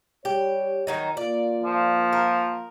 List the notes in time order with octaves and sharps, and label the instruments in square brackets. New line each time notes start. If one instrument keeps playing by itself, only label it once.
[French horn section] G3 C#5 [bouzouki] G4
[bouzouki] D#3 F#3 D#4
[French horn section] A#3 F4 [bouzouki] D5
[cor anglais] F3
[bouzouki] A#4